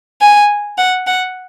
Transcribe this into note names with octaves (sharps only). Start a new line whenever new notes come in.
G#5
F#5
F#5